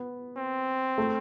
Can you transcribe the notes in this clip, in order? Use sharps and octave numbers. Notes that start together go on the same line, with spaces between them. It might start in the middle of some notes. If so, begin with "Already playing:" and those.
Already playing: B3
C4
A3